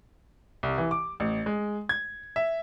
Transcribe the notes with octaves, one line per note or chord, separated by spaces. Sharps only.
C2
E3
D6
A1
G#3
G#6
E5